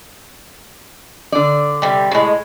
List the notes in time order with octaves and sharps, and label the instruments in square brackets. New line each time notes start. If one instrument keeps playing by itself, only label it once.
[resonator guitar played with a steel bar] D3 D5
[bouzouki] C3 G3
A2 G#3